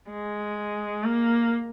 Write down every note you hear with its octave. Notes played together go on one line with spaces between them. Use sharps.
G#3
A#3